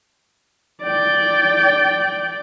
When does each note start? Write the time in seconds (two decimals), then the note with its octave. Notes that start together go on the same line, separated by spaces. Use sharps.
0.83 D5 G5